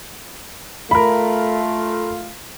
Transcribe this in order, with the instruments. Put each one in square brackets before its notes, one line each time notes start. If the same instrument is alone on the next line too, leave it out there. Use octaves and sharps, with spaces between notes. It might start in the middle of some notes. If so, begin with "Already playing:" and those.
[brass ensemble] A3 F4 [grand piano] A#4 B5